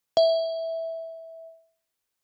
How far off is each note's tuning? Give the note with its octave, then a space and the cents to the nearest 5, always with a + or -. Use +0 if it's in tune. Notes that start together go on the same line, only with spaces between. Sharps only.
E5 -10